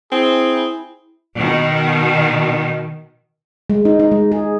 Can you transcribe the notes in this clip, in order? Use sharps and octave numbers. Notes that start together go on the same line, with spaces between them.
C4 E4 G#4
B2 D#3
G#3
D#4
D#4
G#3
G#4